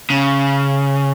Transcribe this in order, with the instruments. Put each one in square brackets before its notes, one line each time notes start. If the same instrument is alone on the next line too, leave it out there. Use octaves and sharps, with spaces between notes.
[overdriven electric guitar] C#3